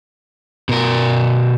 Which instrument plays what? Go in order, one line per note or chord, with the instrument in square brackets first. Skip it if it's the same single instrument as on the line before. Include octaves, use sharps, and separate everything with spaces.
[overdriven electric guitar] B2 A#4